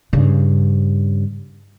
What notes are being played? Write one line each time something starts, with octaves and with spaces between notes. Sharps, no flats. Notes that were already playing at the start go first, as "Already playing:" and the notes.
G2 C#3